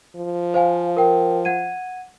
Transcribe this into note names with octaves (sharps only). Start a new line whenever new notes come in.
F3
C5 F5 G#5
A#4 G5
F#5 G#6 D#7